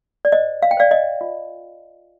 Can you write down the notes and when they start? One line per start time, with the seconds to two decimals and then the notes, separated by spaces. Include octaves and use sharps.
0.25 D5
0.32 C5 D#5
0.63 F5
0.71 G5
0.77 C5 D5 F5
0.91 D#5
1.21 F4